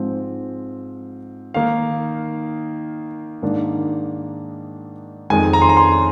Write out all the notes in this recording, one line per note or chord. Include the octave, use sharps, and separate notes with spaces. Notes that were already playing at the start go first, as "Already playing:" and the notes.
Already playing: G#2 F3 C4
D#3 A#3 D#4 F5
G#2 D#3 A#3 D4
F2 D#3 G#3 G#5
A#5
C6
A#5
C6